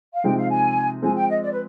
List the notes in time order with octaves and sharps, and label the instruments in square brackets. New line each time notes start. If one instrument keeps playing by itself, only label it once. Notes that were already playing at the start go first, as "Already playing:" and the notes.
[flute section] F5
[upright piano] C3 F3 G#3 C4 D#4 [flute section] G5
[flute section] F5
G#5
[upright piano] F3 G#3 C4 [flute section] G#5
[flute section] G5
D#5
D5
B4